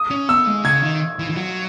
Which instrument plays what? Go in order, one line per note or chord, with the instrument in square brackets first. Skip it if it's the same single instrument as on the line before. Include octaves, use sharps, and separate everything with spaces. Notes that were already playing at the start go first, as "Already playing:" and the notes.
Already playing: [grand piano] D#6
[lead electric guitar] C#4
[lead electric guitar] B3 [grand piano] E6
[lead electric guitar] G#3
[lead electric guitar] C#3 [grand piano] G#6
[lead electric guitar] D#3
E3
E3
F#3